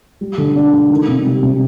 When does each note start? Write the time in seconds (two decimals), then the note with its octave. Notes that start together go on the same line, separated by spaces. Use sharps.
0.21 G3
0.38 D3
0.56 D4
0.73 D3
0.90 D#3
1.08 C3
1.25 G3
1.43 C3